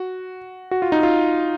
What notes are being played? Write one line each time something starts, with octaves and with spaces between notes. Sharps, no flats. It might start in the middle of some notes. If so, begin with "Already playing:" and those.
Already playing: F#4
F#4
F4
D#4
F4